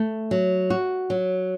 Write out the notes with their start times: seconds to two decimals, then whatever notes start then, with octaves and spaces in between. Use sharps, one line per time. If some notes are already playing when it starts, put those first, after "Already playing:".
Already playing: A3
0.31 F#3
0.70 F#4
1.10 F#3